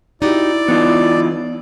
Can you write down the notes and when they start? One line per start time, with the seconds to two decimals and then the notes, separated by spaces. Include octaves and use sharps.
0.22 D#4 E4 F#4 G4 D5
0.68 E3 B3 D#4 F4